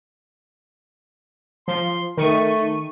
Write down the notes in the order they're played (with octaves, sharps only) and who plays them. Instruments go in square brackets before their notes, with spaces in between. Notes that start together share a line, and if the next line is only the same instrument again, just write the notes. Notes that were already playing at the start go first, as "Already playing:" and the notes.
[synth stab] F3 [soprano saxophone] C6
[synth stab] D#3 C#6 D#7 [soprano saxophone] A3